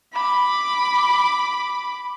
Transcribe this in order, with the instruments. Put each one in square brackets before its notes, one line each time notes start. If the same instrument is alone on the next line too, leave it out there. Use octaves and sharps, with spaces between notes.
[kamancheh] B5 D6